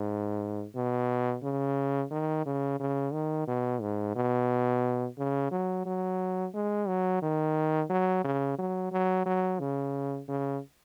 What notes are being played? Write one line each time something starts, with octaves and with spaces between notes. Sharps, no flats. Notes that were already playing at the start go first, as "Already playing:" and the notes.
Already playing: G#2
B2
C#3
D#3
C#3
C#3
D#3
B2
G#2
B2
C#3
F#3
F#3
G#3
F#3
D#3
F#3
C#3
F#3
F#3
F#3
C#3
C#3